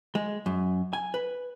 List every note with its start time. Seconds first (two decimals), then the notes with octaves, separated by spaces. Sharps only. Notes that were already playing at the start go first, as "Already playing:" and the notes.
0.15 G#3
0.46 F#2
0.93 G#5
1.14 B4